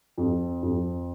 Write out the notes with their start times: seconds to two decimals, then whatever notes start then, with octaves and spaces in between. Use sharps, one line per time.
0.18 F2
0.63 F2